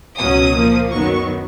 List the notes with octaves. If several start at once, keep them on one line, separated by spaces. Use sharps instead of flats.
C#2 B2 F#3 C#4 D#6
A#2 F3 A#3
F#2 D#3 F#3 B3 C#6